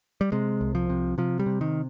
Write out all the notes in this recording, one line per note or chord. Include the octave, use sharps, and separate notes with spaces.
G3
C3 G#3
C2
F3
C3
C3 F3
G3
C3
D#3